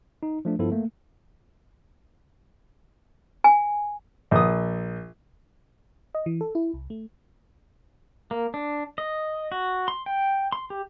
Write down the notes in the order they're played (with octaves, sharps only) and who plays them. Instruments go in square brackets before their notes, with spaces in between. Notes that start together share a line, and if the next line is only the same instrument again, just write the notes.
[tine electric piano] D#4
F3 A3 D4
G2 F3 B3 E4 A4
A3 A#3
[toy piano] G#5
[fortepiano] A#1 D#6
[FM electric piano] D#5
E3
A4
E4
C2
A3
[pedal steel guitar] A#3
D4
D#5
F#4
C6
G5
C6
G4